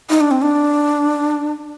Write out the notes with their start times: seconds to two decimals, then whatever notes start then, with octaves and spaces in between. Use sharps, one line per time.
0.10 D#4
0.21 D4
0.31 C4
0.42 D4